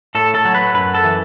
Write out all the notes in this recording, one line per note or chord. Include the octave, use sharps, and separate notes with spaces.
A2 A4
A4
F#3
B4
F#2 B4
A4
E3